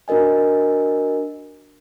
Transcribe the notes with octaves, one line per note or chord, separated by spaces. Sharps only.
D4 F#4 A#4 D#5 G#5